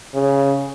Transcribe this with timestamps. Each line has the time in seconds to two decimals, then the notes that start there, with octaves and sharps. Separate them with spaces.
0.15 C#3